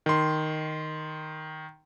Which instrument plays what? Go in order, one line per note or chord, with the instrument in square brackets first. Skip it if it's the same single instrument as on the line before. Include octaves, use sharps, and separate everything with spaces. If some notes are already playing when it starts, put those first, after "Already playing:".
[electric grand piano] D#3 C6